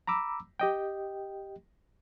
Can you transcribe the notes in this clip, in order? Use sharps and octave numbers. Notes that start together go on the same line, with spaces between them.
A#5 B5 D6 E6
G4 D#5 G5